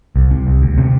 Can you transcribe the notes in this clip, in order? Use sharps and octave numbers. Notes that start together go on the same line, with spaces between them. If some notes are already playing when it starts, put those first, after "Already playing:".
C2
C3
C2
D2
C3